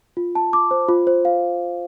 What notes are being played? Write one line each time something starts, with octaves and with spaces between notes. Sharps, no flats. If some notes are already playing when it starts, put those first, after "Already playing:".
F4
A5
D6
C5
F4
C5
F5